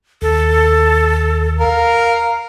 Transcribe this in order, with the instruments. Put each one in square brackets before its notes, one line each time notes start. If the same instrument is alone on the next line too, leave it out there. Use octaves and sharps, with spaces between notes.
[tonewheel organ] D#2 [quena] A4
[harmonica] A#4 [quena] F5